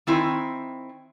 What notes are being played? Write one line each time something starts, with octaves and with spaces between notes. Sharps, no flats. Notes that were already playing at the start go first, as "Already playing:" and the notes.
D#3 C4 E4 G#5